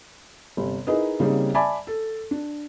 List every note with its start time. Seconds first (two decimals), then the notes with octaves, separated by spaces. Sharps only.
0.57 G1 C3
0.87 D#4 E4 G#4 A#4 B4 D#5
1.20 C#3 G3 A#3 C4 D#4 G#4
1.54 D5 E5 G#5 A5 B5 D6
1.87 A4
2.31 D4